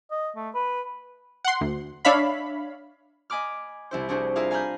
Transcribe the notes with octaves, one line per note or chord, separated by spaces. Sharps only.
D#5
A3
B4
F#5 C6
D2
D4 C#5 E5 F5 B5
D#5 G#5 B5 D6 F6
C2 E4 C5
C4 D4 E4 F#4 G#4 C5
E4 F4 G#4 A#4 E5 F5
F5 G#5 A#5 B5 F6 G6